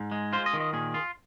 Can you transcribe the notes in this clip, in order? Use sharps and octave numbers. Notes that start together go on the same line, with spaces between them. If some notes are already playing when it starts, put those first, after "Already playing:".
Already playing: G#2
G#3
F4 C5
D#5
D#3
D#5
A#2 G#4
F4